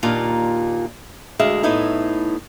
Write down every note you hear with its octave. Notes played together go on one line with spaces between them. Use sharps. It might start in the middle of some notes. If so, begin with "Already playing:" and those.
D#2 A#2 D4 F4
D2 G#3 E5 F5
A2 B3 D#4 E4